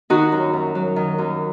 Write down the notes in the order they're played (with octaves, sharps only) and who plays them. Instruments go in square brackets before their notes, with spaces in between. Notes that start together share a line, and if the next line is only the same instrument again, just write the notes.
[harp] D#3 D#4 F#4
F#2
F#2
F#3
D#3
F#2